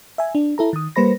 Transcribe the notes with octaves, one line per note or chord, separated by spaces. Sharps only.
E5 G#5
D4
E4 A4 A#5
D#3 D#6
G3 A#3 B4 C5 B5 A#6